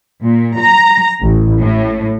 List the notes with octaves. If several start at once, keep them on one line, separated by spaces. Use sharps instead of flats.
A#2
A#5
A1
A2